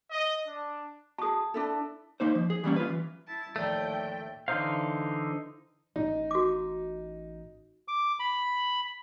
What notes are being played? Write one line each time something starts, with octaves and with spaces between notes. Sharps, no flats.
D#5
D4
F#4 G#4 A5 D#6
D4 E4 A4
A#3 D#4 C5
F3
G#4
E3 G3 A#3 C#4
F4 B4
E3
E4 A5
D#2 A2 F3 A3 D5 G5 A#5
D3 E3 D#4 C5 F5
A1 D#4
F#4 D6
D6
B5